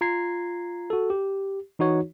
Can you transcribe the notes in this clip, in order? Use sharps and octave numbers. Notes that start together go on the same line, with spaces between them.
F4 A#5 G#6 C7
F#4 A4
G4
E3 D#4 F#4 C#5